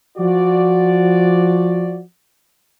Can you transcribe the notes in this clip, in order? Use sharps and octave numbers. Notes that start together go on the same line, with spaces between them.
F3 F#4 D5